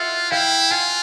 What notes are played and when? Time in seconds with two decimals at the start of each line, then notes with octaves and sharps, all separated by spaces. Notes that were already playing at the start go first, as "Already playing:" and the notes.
Already playing: F4 E5 F#5
0.31 E4 F5 G5
0.71 F4 F#5 G#5